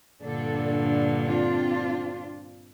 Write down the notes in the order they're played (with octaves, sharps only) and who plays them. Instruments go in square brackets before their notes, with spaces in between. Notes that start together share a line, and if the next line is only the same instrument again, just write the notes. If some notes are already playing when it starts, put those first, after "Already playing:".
[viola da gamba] G2 A#2 D3 [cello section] D4 A4
[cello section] C4 D4 F4